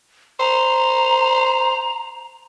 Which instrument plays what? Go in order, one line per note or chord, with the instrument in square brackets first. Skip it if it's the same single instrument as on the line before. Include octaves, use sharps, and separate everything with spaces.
[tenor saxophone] C5 [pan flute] A#5